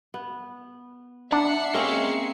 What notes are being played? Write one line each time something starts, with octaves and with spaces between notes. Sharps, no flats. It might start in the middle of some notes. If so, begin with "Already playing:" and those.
B3
D4 E5 F#5 C7 C#7
A#3 C4 C#4 G#4 D#5